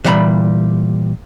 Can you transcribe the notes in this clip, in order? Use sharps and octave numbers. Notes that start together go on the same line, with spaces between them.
A#2 E3 G3 F#5 A#5 B5